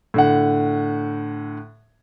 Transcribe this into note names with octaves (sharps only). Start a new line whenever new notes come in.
A2 D3 F#5